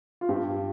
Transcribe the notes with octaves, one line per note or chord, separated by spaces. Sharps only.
F4
G2 G4